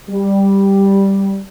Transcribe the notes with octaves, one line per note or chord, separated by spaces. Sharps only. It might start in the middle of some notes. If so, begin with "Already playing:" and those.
G3